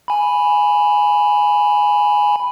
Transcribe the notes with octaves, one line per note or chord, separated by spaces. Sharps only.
G#5 B5